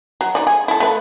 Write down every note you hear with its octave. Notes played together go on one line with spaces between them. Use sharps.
F#3
D#4 D5
G#4
E4 A4
A3 B4